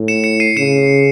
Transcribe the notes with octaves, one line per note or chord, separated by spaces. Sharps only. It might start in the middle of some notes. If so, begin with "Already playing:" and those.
Already playing: A2
C#7 E7
C#7 E7
C7 D#7
C#3 C#7 E7